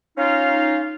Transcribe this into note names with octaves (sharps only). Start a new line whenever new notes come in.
C#4 D#4 F4 F5